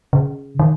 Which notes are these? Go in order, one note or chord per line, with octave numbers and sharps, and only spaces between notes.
C#3
D#3